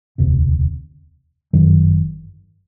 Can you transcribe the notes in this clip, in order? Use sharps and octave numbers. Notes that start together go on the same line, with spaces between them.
E1 D2 C3
G1 F#2 D#3 F#3